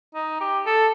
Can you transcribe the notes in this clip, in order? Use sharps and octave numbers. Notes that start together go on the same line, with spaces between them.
D#4
G4
A4